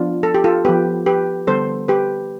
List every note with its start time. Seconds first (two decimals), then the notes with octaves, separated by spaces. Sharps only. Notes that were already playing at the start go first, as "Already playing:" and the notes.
Already playing: F3 B3 D4 F4
0.23 A4
0.34 G4
0.44 F4 A4
0.65 F3 B3 G4 B4
1.06 G4 B4
1.47 D3 G3 B3 A4 C5
1.88 G4 B4